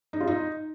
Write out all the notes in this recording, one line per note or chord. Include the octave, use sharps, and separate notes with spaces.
D#4
F4
D#4